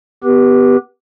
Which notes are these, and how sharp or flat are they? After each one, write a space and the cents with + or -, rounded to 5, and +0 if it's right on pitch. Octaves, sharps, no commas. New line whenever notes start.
B3 +15 G4 +0 B4 -30